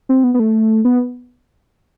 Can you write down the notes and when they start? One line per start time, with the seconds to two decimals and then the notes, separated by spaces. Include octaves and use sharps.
0.09 C4
0.24 B3
0.34 B3
0.39 A3
0.85 B3